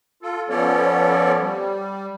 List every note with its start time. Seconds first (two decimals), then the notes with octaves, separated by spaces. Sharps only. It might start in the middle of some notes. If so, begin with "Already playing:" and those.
0.23 F4 A4
0.49 F3 B3 C#4 A4 C#5 D5
1.40 G3